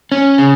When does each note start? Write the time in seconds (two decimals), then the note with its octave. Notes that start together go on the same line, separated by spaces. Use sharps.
0.12 C#4
0.38 C#3